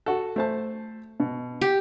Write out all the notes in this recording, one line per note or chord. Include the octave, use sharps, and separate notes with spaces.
F#4 A4
A3 C5 A5
B2
G4